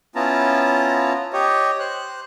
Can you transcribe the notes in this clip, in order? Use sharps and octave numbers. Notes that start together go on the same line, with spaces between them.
B3 C#4 E4 F4 A5 A#5
G4 C#5 D#5
C5 F#6